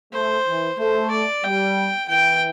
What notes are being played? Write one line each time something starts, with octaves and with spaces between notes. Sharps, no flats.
A3 C5
E3
A3 C5
D5
G3 G5
E3 G5